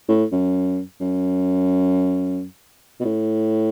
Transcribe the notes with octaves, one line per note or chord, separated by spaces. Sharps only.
A2
F#2
F#2
B2
A2